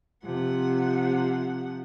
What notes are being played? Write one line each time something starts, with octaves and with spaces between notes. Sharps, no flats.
C3 F3 F#5